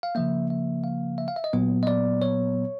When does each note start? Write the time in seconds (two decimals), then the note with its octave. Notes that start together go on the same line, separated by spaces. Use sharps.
0.03 F5
0.15 C#3 F3 A#3 E5
0.50 E5
0.84 F5
1.18 E5
1.28 F5
1.36 E5
1.44 D#5
1.53 A#2 F#3 B3
1.83 D#5
1.87 D5
2.22 C#5